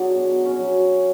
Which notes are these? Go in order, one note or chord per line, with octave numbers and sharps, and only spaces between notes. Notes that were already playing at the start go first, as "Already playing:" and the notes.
Already playing: F#3 D4 F#4 G#4
B2
C#4
F#3